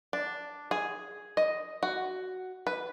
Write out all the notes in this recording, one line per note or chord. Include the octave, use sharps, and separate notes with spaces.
D4
G#4
D#5
F#4
B4